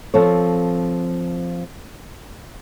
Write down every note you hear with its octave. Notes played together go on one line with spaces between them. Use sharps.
F3 C4 A4 C#5